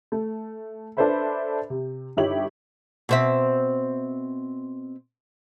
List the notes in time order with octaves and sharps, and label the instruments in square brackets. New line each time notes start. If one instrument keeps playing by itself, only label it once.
[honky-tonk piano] A3
D4 A4 B4 C5 E5 B5
C3
G1 D#4 E4 G4 C#5 F#7
[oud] B2 C4 E5